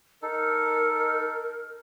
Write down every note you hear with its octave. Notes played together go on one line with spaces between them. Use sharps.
D#4 A4 A#4